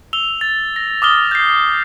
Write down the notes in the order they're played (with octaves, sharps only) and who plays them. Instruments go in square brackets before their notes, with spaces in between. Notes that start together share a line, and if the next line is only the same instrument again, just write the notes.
[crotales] E6 F7 G7
A6
A#6
D6 D#6 F6 G7
G6 C7